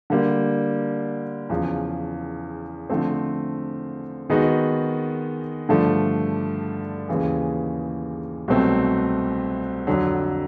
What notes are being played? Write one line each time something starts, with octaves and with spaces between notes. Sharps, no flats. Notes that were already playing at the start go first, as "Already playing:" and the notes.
D3 G3 A#3
E2 C#3 F3
D3 F3 A3 C4
D#3 G#3 B3 D#4 F#4
G2 D3 F3 A3
D#2 C#3 E3 G#3
C2 B2 F#3 A3 C4
F2 D3 F#3